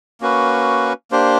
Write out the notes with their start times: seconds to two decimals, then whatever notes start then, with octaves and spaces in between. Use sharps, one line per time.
0.21 A#3 C#4 F#4 B4
1.11 A#3 D4 G4 C5